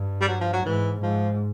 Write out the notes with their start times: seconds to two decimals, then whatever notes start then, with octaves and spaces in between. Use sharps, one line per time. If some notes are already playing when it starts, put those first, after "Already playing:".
Already playing: G2
0.22 G3
0.28 F#3
0.41 F3
0.53 F#3
0.65 G#2 E3
1.03 G#2 F3